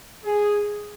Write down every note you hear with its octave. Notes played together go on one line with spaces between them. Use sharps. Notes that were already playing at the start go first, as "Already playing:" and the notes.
G#4